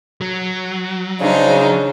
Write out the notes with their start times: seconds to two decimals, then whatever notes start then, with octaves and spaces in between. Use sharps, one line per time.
0.21 F#3
1.21 C#3 D4 D#4 C5